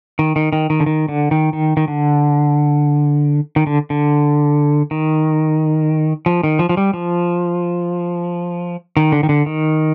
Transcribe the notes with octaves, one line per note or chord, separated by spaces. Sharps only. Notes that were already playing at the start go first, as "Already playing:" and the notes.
D#3
D#3
D#3
D#3
D3
D#3
D3
D#3
D#3
D#3
D3
D#3
D3
D3
D#3
F3
D#3
F3
F3
G3
F3
D#3
D3
D#3
D3
D#3